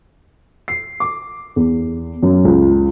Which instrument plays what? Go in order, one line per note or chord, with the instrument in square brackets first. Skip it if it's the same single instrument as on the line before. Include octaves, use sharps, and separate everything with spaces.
[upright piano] C7
D6
E2
F#2
C#2